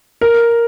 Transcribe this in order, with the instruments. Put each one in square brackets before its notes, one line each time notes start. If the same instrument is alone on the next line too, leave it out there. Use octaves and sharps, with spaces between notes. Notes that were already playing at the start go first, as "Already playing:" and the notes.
[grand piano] A#4